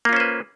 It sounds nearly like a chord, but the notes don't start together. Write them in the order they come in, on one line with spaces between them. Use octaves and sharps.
A#3 F4 C#4 C5 B4